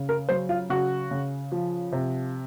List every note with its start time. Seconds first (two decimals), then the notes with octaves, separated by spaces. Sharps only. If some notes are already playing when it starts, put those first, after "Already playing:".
Already playing: C#3
0.09 A#4
0.29 F#3 C5
0.49 F4
0.70 C#3 F#4
1.11 C#3
1.52 F3
1.92 C3